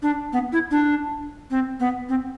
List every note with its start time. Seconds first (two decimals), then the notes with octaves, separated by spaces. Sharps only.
0.02 D4
0.33 B3
0.52 E4
0.71 D4
1.51 C4
1.80 B3
2.09 C4